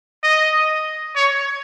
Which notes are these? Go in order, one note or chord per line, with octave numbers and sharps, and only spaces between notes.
D#5
C#5